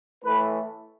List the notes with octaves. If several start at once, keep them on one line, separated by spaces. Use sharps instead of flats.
A2 E3 A3 B4